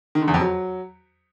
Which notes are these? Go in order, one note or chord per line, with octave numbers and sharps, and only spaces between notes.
D#3
D3
E2
F2
F#3